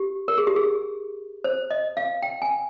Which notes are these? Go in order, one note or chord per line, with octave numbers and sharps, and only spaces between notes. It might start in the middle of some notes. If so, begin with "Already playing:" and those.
Already playing: G4
A#4
G#4
G4
G#4
C5
D#5
F5
G5
G#5